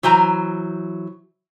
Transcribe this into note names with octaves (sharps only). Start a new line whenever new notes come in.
E3 F#3 C5 G#5 A#5